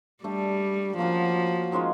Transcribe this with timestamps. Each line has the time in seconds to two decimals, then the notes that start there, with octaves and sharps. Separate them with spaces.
0.24 G3 A3 D4 G4
0.98 F3 A#3 C#4 F#4
1.72 D#3 G#3 C#4 F4